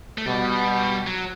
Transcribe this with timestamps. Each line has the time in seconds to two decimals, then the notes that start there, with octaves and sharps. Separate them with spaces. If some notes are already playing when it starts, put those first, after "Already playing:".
0.18 A3
0.26 B2 G3
1.07 F#3